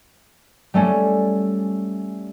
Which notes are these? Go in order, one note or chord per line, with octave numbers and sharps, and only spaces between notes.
G3 A3 C#4